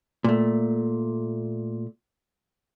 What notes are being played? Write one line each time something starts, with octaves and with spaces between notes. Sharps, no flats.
A#2 A3